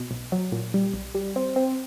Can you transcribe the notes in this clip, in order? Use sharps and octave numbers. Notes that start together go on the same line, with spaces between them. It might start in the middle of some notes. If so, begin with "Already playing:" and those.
Already playing: B2
B1
F#3
A#2
G3
B1
G3
C4
C4